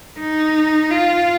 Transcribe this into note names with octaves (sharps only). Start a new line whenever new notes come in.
D#4
F4